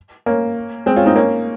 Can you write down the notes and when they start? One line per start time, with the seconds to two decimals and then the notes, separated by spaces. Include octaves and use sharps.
0.26 A#3 C#4
0.86 G#3 C4
0.96 C#4 F4
1.06 C4 D#4
1.16 A#3 C#4